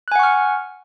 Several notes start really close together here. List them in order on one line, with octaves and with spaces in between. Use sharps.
F#6 G#5 F#5 C#6 F6